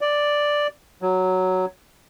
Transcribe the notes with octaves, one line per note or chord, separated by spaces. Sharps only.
D5
F#3